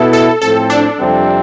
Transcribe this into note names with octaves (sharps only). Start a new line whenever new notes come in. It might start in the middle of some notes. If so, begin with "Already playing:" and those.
Already playing: B2 B3 E4 A4
A4
A2 F3 C4 A4
D4
F2 C3 G3 C4